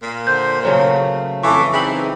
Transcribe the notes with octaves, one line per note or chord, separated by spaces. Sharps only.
A#2
D3 C5 G6
C#3 F#3 A3 C5
F2 E3 A4 C#6 D6
E3 C4 D#4 G#4 F#7